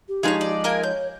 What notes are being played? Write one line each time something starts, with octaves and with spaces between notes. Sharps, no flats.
G4
F3 G#3 D#4 G#4 B4 C#5
D5
A#3 A#4 F5 G#5
C#5 G6